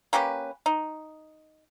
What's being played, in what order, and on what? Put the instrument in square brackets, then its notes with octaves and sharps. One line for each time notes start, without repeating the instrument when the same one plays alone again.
[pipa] A#3 C#4 G4 B4
D#4